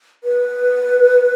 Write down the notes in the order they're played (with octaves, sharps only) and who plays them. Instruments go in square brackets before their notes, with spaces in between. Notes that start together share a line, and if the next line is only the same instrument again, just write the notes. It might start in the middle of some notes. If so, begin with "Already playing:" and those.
[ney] B4